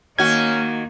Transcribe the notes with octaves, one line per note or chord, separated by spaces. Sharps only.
D#3 A#3 C#4 F#4 G#6